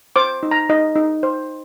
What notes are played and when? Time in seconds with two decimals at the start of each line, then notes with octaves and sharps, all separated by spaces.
0.16 C5 D6
0.43 D#4
0.51 A#5
0.69 D#4 D#5
0.96 D#4
1.23 C5